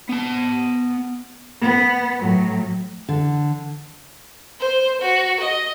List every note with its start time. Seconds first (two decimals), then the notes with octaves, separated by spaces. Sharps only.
0.09 B3 A5
1.61 B3
2.19 A2 F#3
3.09 D3
4.60 C5
5.01 F#4
5.40 D#5